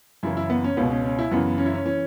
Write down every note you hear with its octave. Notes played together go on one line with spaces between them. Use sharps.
F#2 C#3 E3 E4
E4
B3
C#4
C#2 B2 B3
C#4
C#4
E4
F#2 C#3 E3 B3
C#4
E4
C#4
E3 C#4